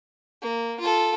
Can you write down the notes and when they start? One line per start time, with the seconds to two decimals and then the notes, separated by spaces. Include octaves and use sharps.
0.42 A#3
0.80 F4 A4